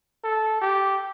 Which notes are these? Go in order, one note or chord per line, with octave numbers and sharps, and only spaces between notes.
A4
G4